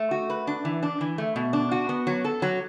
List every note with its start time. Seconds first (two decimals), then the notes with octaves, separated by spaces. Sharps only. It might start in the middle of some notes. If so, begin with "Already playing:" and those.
Already playing: A3
0.11 F#4
0.30 B4
0.47 D4
0.65 E3
0.83 D4
1.01 E3
1.18 A3
1.36 B2
1.53 D4
1.72 F#4
1.89 B3
2.07 F#3
2.24 A4
2.42 F#3